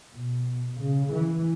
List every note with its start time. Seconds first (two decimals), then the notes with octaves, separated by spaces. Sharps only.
0.15 B2
0.80 C#3
1.12 E3